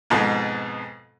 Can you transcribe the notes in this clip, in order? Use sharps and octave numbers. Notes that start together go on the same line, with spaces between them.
F2 G#2 B2